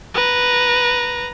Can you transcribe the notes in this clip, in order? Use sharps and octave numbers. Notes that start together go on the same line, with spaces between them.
B4 A#5